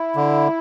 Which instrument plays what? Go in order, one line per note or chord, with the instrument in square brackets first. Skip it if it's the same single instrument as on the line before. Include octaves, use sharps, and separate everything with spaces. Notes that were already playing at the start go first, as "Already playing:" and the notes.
Already playing: [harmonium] E4
[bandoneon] D3